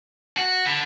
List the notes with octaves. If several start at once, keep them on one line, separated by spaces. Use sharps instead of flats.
F#4
D3 B5